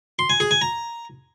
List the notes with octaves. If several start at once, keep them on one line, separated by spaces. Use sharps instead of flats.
C6
G#5
G#4
G#5
A#5